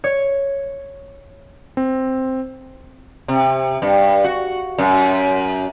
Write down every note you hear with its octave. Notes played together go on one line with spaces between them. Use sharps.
C#5
C4
C3
G2
F#4
F#2